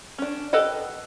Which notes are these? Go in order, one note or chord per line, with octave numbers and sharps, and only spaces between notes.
C#4 D4
G4 A4 B4 D#5 F#5